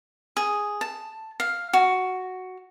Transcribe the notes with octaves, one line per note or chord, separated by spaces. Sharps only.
G#4
A5
F5
F#4